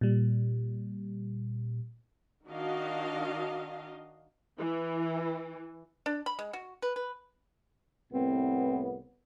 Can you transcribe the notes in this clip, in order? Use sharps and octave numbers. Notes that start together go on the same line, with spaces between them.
A#2 G3
D#3 D4 F#4 D#5 F5
E3
D4
B5
G#3
F#4
B4
B4
C2 A2 B3 C4